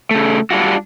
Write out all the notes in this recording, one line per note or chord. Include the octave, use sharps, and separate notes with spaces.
C#3 A3
G3 D4 F4 F#4